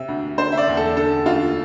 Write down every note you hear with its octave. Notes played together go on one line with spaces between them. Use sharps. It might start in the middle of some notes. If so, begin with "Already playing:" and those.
Already playing: C3 E5
D2
D3 C5
E5
D5
E2
A4
D3 A4
D2 F4